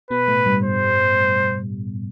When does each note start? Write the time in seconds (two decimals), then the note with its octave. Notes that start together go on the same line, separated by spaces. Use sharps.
0.11 B2 B3 B4
0.28 A2 A3
0.46 G2 G3
0.64 C5